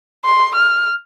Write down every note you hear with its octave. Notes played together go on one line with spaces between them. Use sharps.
C6
F6